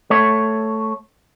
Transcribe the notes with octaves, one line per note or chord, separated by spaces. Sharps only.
A3 C#5